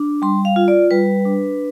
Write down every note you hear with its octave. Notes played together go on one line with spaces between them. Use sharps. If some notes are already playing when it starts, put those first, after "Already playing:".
Already playing: D4
G3 C6
F5
F4
D5
G3 B4
D4